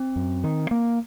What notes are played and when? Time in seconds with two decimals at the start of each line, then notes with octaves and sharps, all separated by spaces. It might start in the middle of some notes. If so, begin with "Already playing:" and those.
Already playing: C4
0.16 F#2
0.44 D#3
0.71 A#3